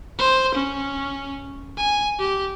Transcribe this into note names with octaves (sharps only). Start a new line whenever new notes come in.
C5
C#4
G#5
G4